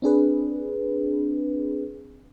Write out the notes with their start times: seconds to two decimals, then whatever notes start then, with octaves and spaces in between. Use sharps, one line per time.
0.02 C4 D4 G#4 B4